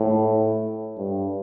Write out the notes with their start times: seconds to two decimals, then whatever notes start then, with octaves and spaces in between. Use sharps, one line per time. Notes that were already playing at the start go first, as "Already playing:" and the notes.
Already playing: A2
0.98 G2